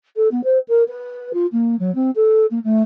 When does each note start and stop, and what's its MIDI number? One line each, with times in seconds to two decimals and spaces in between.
0.16 0.28 69
0.31 0.41 59
0.44 0.58 72
0.68 0.83 70
0.88 1.33 71
1.33 1.46 65
1.52 1.76 58
1.79 1.94 54
1.95 2.10 60
2.15 2.46 69
2.51 2.59 58
2.64 2.82 57